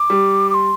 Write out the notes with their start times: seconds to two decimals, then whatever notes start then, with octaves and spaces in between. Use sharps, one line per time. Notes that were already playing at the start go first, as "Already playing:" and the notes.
Already playing: D6
0.10 G3
0.50 D6
0.54 C6